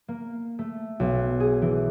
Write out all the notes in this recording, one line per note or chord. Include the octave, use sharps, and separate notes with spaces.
A#3
A3
B1
G#4
E3